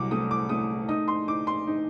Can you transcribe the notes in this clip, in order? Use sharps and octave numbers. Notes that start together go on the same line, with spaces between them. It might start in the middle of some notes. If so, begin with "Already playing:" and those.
Already playing: C2 F#3 D6
A3 D#6
D6
A3 D#6
D#4 D#6
C6
D#4 D6
C6
D#4